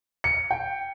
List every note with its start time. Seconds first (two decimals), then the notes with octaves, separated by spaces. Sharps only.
0.24 C#7
0.51 G5